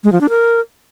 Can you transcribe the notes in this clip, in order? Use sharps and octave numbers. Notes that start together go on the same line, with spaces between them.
G#3
F3
D4
A#4